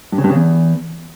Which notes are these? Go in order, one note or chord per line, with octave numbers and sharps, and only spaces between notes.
G2
C#3
G2
C#3
E2